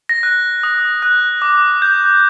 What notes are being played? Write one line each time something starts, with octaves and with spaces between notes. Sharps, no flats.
A#6
F#6
D#6
F#6
D6
G6